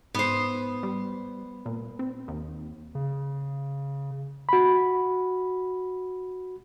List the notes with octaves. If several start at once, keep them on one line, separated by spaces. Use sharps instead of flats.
G#2 B3 C5
G3
A#2
C4
D#2
C#3
F#4 B5